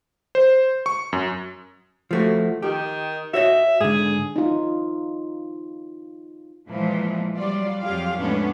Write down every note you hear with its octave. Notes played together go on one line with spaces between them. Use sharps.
C5
C#6
F#2
F3 A3 F#4
D#3 G4
F#4 C#5 D#5 E5
G#2 D3 G#4
D#4 F4
A#2 E3 F3 G#3
F#3 G3 F4 D5
F2 F#3 F4 G4 G#4 F5
F2 A2 G#3 B3 C#4 D4